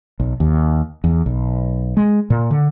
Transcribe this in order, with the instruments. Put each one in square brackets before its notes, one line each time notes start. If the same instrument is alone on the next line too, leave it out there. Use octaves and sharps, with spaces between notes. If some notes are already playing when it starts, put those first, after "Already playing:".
[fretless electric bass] B1
D#2
E2
B1
G#3
A#2
D3